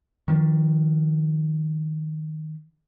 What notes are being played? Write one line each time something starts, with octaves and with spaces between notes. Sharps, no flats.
D#3 F3 A#3 D4